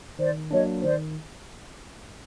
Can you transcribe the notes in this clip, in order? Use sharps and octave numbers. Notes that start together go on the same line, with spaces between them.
D#3 C5 D5
F#3 A#3 D4 C#5 D#5
D#3 C5 D5